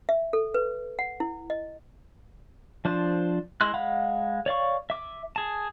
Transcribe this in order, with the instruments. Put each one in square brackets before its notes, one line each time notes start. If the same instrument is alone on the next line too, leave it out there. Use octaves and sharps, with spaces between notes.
[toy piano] E5
A4
B4
F#5
E4
D#5
[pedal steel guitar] F3 D4 C5
G#3 E4 C6 F#6
G#3 F5 F#5 B5
C#5 D5 F5 C#6
E5 D6
G#4 A5